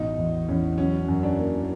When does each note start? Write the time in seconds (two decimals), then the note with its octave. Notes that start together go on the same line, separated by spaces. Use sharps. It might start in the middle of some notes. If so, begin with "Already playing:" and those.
Already playing: A1 B2 D#4
0.18 E2
0.48 E2 C#4
0.78 F#3 C#4
1.08 F#2
1.23 D4
1.38 A#3